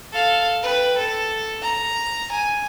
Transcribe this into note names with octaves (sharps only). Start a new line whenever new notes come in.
A4 F5
B4 G5
A4
A#5
G#5